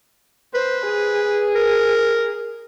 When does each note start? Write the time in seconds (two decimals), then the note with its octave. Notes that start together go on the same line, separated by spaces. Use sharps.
0.54 B4 C5
0.86 G#4
1.55 A#4